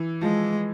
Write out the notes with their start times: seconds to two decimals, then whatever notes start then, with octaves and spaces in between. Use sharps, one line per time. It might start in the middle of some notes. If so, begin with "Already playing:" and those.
Already playing: E3
0.21 F3 G#3